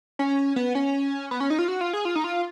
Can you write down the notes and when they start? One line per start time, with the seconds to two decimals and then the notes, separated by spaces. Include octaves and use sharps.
0.19 C#4
0.56 B3
0.75 C#4
1.31 B3
1.40 C#4
1.50 D#4
1.59 F4
1.68 F#4
1.81 F4
1.93 G#4
2.05 F4
2.16 D#4
2.24 F4